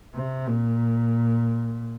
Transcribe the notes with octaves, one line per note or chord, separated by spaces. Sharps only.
C3
A#2